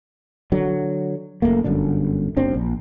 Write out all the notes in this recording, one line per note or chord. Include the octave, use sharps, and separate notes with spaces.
D3 F#3
F#1 D#2 A3 A#3
G1 F#2 D3 D4
F#1 F#2 C4 D4
A#1